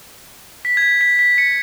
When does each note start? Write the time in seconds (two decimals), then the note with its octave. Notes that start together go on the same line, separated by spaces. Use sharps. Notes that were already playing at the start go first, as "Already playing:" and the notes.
0.65 B6
0.77 G#6
0.82 B6
1.01 B6
1.19 B6
1.38 C#7